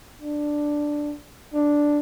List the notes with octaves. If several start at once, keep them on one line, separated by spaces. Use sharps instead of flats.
D4
D4